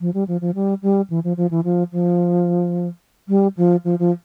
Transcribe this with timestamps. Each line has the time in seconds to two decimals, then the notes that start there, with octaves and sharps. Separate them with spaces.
0.01 F3
0.14 G3
0.28 F3
0.41 F3
0.55 G3
0.82 G3
1.10 E3
1.24 F3
1.37 F3
1.51 E3
1.64 F3
1.92 F3
3.28 G3
3.57 F3
3.84 F3
3.99 F3